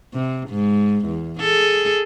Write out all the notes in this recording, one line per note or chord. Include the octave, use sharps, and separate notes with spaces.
C3
G#2
E2
G#4 A4